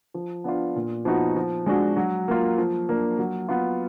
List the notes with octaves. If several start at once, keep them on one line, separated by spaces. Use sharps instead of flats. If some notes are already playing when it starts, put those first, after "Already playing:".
F3
B3 D4 F4
A#2
F3 B3 D#4 F#4
F3
G#3 D4 F#4
F#3
A#3 F4
F3
A#3 D4
F#3
B3 F4